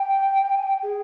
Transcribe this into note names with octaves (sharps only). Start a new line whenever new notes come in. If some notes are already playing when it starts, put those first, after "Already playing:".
Already playing: G5
G#5
G5
G#4